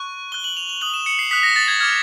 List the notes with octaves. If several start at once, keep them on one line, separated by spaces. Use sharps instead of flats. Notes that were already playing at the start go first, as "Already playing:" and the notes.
Already playing: C#6 F#6
C#6 F#6 G7
F#7
F7
F7
D#6 F#6 F#7
E7
C#7
C7
D#6 F#6 B6
A#6
A6
G#6
D6 F6 G#6